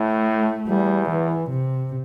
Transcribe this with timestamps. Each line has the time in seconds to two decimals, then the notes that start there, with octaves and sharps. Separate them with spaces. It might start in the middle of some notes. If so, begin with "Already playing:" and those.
Already playing: A2 A3
0.67 E2 G3
1.09 E3
1.50 C3